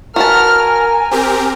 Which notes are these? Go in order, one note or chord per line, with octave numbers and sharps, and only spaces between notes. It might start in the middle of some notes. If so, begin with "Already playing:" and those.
F#4 A#4 B4 A5 F6
G#5
C4 G4 A#4